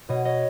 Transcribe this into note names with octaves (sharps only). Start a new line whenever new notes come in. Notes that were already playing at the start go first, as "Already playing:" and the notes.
B2 C#5 D#5
C#5 D#5